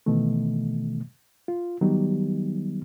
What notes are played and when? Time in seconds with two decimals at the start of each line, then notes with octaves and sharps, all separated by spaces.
0.06 B2 D#3 E3 A3
1.48 F4
1.81 D#3 F#3 G3 B3 D#4 G4